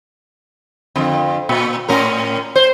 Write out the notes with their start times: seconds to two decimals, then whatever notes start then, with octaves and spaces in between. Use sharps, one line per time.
0.96 F2 D3
1.49 A#2
1.89 A2 C#4 A#4
2.56 C5